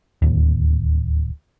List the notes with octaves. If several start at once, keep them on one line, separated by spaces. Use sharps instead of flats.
D1 D#2